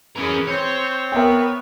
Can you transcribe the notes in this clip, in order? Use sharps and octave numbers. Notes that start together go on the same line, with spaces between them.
E3 C#4 G#4 A#4
C4 C5 C#5
B3 A#4 E5 G5